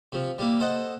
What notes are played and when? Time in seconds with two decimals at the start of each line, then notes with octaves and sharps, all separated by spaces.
0.12 C3 F3
0.38 G3 A#3 E4
0.60 A4 C5 D#5 F#5